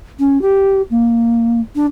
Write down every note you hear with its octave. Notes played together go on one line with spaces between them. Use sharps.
C#4
G4
A#3
D4